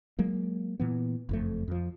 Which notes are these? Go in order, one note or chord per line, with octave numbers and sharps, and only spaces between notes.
F#3 G#3 A#3
A#2 E3 B3
F#1 F2 A3
F2 F3